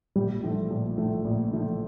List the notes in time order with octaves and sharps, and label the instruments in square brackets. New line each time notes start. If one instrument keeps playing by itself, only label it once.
[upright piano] A#1 [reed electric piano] G3
[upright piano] A2 F3 A3
A#1
A2 F3 A3
A#1
A2 F3 A3